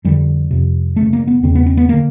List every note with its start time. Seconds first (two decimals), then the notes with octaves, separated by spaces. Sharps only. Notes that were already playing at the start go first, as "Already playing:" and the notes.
0.04 F2 D3 G3
0.51 F2 C3
0.96 F#2 C#3 A3
1.13 A#3
1.27 B3
1.43 E2 C#3 C4
1.55 B3
1.66 C4
1.77 B3
1.89 D3 A#3